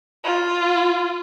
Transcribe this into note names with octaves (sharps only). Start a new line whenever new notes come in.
F4